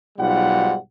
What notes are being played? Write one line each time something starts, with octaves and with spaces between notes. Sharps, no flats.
B1 G#2 G3 F4 F#5